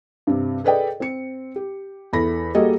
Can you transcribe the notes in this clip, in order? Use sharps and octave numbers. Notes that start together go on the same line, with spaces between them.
G2 C3
G#4 A4 B4 D5 D#5 G5
C4 C#7
G4
E2 E4 A4 B5 A#6
G3 A#3 F#4 G#4 A4 D#5